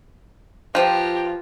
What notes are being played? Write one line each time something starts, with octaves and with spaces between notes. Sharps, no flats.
F3 F4 G4 B4 C5 G5 A#5